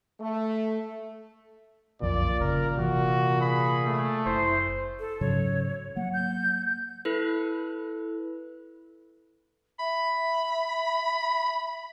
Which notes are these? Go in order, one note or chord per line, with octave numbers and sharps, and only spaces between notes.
A3
B1 F2 A#2 D3 D5
G1 C#3 A#4
C3 E3 F#4
G#4 B5
A3
F#1 E4 C5
A4
G#2 C#3 F#3 C#5
F#3 A#3 F#5
G6
E4 A4 B4
E5 B5